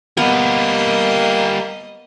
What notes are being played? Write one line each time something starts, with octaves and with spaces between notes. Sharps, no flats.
G3 A#3 B3 A#4 D#5